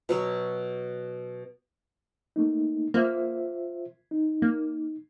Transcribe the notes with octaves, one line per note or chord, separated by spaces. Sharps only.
B2 F#3 C#5
A3 A#3 D#4
A#3 F4 C5 E5
D#4
A#3